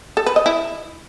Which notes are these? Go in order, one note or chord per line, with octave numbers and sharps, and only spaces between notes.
A4
B4
D#5
E4